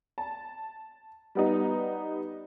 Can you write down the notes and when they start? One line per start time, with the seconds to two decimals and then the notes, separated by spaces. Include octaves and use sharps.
0.18 A5
1.35 G3 B3 D#4